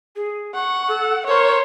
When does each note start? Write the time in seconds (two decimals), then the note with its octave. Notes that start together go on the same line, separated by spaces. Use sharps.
0.16 G#4
0.55 F#5 C#6
0.88 A4
1.27 A#4 C5 C#5